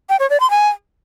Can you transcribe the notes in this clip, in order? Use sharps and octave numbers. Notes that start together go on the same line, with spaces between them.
G5
C#5
D5
C6
G#5